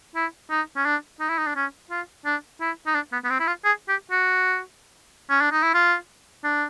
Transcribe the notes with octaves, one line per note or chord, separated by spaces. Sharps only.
E4
D#4
C#4
D4
D#4
E4
D#4
D4
C#4
F4
D4
E4
D#4
D4
B3
B3
C4
E4
F4
G#4
G4
F#4
C#4
D4
D#4
E4
F4
D4